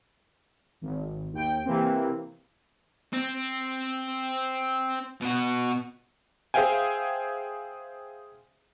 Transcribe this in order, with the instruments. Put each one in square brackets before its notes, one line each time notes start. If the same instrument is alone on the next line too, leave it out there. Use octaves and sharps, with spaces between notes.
[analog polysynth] G#1
D#2 G5
C3 E3 A#3 C4
[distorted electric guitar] C4
B2 F#4
[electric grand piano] G#4 C5 E5 F5 G5 G#5